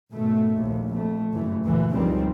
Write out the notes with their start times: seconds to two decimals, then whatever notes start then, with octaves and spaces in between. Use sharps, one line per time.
0.11 G#1 B2 A3
0.56 A#1 D#2
0.92 F2 A3
1.32 F#1 G2 E3 A3
1.63 D2 A#2 E3
1.93 C#2 G2 D#3 F3 G3 C4